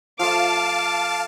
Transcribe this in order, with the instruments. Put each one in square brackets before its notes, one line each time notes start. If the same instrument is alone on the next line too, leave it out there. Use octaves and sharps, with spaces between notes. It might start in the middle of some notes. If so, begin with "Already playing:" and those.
[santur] F3 A3 [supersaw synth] F5 A5 [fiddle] D6